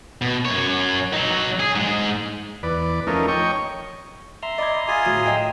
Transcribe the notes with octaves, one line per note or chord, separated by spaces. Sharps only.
B2
F#2 C#5
F#3 D#4
G#4
G#2 G#3
E2 B4 D5
F3 A3 C#4 D#4 A#4
C#5 D#5 G5 C#6
E5 A#5 C6
D5 D#5 B5 G#6
F4 G#4 G#5
A2 F#3 D#7
D#5 G5